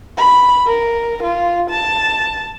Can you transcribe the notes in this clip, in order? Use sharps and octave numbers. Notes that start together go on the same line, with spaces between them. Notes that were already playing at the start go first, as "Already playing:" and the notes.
B5
A#4
F4
A5